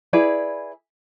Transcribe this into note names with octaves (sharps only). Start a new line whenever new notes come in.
E4 G#4 B4 D5